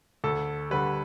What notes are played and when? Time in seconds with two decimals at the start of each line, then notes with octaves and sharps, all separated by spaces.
0.24 D2 A4
0.70 D3 G3 B4